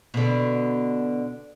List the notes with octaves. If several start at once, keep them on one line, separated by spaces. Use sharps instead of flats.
B2 D3